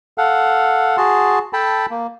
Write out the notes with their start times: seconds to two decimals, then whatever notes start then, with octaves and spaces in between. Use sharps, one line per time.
0.18 A4 F5 F#5
0.97 F#4 G#4 A5 C6
1.53 A4 G5 A5 B5
1.90 A#3